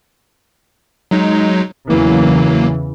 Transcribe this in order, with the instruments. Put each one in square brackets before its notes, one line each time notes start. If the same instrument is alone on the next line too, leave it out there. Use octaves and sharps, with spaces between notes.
[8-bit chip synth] F#3 G#3 D#4
[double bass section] E2 C#3 E3 [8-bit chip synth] F#3 A#3